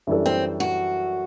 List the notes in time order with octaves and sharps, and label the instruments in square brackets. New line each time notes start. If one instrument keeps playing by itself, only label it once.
[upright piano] F#2 E3 G3 D4 A4
[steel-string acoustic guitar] C4
F#4